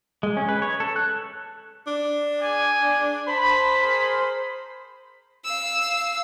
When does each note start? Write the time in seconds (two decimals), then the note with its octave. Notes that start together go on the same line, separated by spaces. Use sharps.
0.23 G#3
0.37 C#4
0.49 B4
0.62 C#5
0.80 A4
0.96 F#6
1.87 D4
2.40 G#4 D5 G#5
3.28 C5 A5 B5
3.81 G#4 A#4 B5
5.45 F5 E6